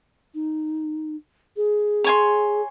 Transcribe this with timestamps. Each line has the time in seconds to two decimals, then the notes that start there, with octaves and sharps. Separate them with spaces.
0.34 D#4
1.57 G#4
2.04 C#5 G#5 C6